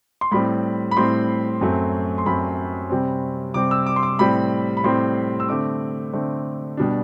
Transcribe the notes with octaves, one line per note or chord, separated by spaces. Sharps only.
C6
A2 G3 C4 B5
B5
A2 G3 C4 C6
F#2 F#3 A3 C4
C6
F#2 F#3 A3 C4 B5
C3 G3 C4
C3 G3 C4 D6
E6
D6
C6
D6
A2 G3 C4 B5
B5
A2 G3 C4 C6
E6
D3 A3 C4 D6
D3 A3 C4
B2 G3 D4